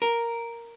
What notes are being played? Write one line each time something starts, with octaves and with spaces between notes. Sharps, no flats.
A#4